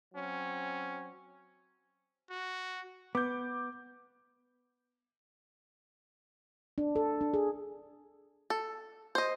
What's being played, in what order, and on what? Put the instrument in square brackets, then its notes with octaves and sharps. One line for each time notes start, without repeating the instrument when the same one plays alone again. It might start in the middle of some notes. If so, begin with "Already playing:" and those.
[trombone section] F#3 C4 C#4
[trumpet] F#4
[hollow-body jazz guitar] B3 [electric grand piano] D6 G6
[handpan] D4
A4
D4
G#4
[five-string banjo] A4
C5 D#5